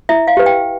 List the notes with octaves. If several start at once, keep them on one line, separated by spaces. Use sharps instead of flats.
E4 E5
F5
G4 B4
G5